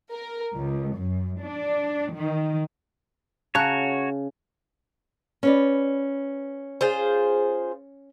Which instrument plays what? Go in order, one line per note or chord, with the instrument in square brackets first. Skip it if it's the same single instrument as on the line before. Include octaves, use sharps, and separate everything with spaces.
[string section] A#4
C#2
F#2
D4
D#3
[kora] C#3 [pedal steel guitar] F#4 C#5 [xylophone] A5 A#5 F#6
[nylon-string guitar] C#4 B4 D5
[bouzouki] F4 G#4 C5